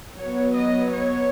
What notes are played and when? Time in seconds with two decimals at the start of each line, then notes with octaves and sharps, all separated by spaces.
0.18 F#3 B3 C#5
0.56 D#5
0.93 C#5